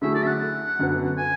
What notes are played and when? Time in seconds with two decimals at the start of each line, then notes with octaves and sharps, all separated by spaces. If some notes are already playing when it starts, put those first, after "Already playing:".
0.02 D3 F#3 A3 E4 G#4 E5
0.15 D5
0.23 E5
0.27 F#5
0.79 F#2 D3 F#3 B3
1.18 G#5